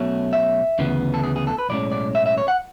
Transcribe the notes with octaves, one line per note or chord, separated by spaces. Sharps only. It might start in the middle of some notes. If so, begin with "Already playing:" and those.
Already playing: B1 B2 A3 C#4
E5
D2 C#3 E3 B3
A4
G#4
G#4
A4
B4
B1 A2 G#3 C#4 D5
D5
E5
E5
C#5
F#5